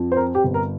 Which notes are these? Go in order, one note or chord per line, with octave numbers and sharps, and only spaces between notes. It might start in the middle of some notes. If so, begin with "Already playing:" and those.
Already playing: F2
C5
C4 A#4
G4
G1
A#4